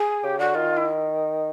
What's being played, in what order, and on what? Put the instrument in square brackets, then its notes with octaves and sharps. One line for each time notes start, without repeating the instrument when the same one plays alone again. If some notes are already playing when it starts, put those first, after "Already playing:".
Already playing: [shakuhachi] G#4
[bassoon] C#3 [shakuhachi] G4
[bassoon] D3 [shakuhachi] F#4
[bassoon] D#3 [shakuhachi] F4
[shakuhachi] E4